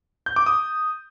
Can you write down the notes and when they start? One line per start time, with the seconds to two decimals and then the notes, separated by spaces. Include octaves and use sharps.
0.26 G6
0.36 D6
0.46 D#6